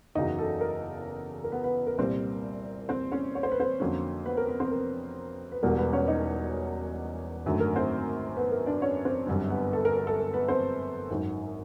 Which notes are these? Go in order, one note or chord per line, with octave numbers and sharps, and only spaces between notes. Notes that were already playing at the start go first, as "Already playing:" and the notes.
F#1 E2 C#3 F#3 D#4 D#5
A4
A#4
A#4
B3 B4
B3 B4
A#4
C2 A#2 G3 C4
C4 C5
C#4 C#5
C#5
C5
B4
C4 C5
F2 D3 F#3 A#3 C#4
B3 B4
A#4
B3 B4
C4 C5
A#4
B4
E1 E2 B2 G3 A#4
B3 B4
C#4 C#5
D#4 D#5
G#1 F#2 D3 F#3 A3
A#4
C4 C5
B3 B4
A#4
D4 D5
C#4 C#5
C4 C5
G1 F#2 D3 G3 C4
B3 B4
A4
A#4
A#4
A4
A#4
B3 B4
C4 C5
G#1 F#2 D#3